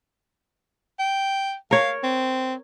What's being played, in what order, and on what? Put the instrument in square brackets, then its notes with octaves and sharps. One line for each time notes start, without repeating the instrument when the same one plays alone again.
[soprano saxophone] G5
[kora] A#4 C#5 [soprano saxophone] F5
[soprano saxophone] C4